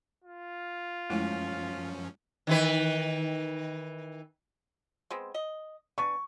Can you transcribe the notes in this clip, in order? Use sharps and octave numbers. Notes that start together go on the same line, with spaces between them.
F4
F#2 F3 G#3 A3 C#4 E4
D#3 E3 B4
G#3 B3 C4
D#5
B3 D4 G#5 C#6